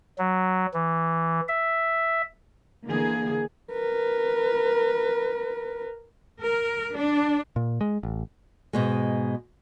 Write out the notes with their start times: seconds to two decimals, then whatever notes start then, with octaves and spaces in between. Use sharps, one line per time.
0.18 F#3
0.74 E3
1.48 E5
2.85 D3 E3 A#3 G#4
3.72 A#4 B4
6.40 A#4
6.95 D4
7.56 A#2
7.81 G#3
8.03 A1
8.73 G#2 B2 G#3